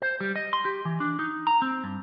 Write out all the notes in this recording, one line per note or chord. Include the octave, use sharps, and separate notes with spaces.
C5
G3
D#5
C6
G4
E3
D4
D#4
A#5
C4
G2